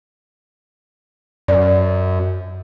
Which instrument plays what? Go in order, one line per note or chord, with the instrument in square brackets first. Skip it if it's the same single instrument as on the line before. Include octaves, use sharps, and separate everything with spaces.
[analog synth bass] F#2 [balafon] D5